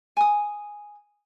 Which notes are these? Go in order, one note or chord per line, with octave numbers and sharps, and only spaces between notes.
G#5 D#6